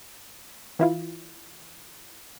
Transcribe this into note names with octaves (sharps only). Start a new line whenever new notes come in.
E3 E4 F4